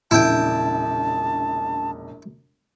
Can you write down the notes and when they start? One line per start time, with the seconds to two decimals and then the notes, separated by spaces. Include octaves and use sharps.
0.11 E1 A#1 C#3 E4 G5 A5